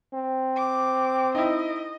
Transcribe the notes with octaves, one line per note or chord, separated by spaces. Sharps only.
C4
D6
D#4 E4 D#5